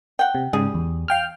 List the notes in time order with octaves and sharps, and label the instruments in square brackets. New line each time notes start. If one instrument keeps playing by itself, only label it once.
[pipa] F#5 G5
[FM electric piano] C3
[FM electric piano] G#2 C#3 [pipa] G3 G#4
[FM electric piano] E2
F5 G5 F6